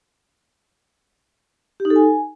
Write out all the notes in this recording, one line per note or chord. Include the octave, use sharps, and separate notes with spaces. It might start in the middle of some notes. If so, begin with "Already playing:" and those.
G4
D#4
A4
G#5